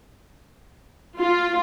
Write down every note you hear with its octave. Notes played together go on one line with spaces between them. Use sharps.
F4